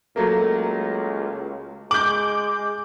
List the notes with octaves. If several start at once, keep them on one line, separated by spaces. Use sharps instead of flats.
C#2 F#3 A3 A#3
G#3 D6 G6 F#7